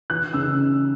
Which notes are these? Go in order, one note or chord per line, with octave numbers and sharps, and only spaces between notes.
E3 F#6
C#3 E6